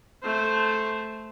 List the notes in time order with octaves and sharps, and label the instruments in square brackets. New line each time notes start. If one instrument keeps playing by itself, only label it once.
[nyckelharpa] A3 C5